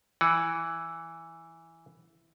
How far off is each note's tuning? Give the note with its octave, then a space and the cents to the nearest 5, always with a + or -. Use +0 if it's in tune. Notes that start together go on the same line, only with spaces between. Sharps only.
E3 +0 F#5 +0